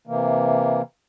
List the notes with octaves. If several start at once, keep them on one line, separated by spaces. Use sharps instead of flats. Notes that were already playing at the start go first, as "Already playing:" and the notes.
C3 E3 A#3